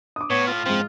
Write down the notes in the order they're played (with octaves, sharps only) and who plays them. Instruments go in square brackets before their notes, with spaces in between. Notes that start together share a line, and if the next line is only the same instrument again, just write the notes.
[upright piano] D6 D#6
[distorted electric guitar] A2 [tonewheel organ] B3 [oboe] C#5
[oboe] F4
[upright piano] G#2 C6 [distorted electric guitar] F3 [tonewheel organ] C4